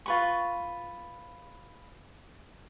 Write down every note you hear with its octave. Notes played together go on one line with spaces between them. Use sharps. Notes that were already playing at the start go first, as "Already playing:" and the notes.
F4 B4 C#6